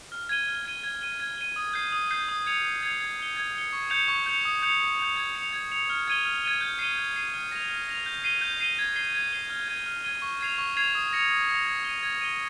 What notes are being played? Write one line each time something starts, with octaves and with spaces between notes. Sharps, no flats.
F6
G#6 D#7 G7
F6
G#6 D#7 G7
G#6
D#7 G7
G#6
D#7 G7
D#6
G6 C7
D#6
G6 C7
D#6
G#6 C#7 F7
D#6
G#6 C#7 F7
G#6
C#7 G7
G#6
C#7 G7
C#6
G6 C#7 F7
C#6
G6 C#7 F7
D#6
G6 C#7 F7
D#6
G6 C#7 F7
G#6
C#7 F7
G#6
C#7 F7
F6
G#6 D#7 G7
F6
G#6 D#7 G7
G6
C7 D#7 G7
G6
C7 D#7 G7
F6
A#6 F7
F6
A#6 F7
G6
C7 D#7 G7
G6
C7 D#7 G7
G#6
C7 G7
G#6
C7 G7
F6
G#6 D#7 G7
F6
G#6 D#7 G7
C#6
G#6 C7 F7
C#6
G#6 C7 F7
D#6
A#6 C#7 F7
D#6
A#6 C#7 F7
G#6
D#7 G7
G#6
D#7 G7